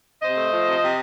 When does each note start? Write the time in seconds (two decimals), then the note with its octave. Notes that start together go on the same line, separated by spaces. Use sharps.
0.22 C3 C5 D#5
0.37 A3
0.52 F3
0.66 C3
0.81 C3